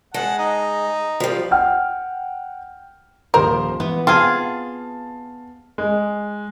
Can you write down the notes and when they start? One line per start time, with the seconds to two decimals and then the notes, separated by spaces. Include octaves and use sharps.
0.14 G#3 F#5 A5
0.38 D#4
1.20 F3 G3
1.51 F#5 G5 F6
3.34 D#1 F3 A#4 C5
3.80 E3 B3
4.07 C4 F4 G#4 F5 A5
5.78 G#3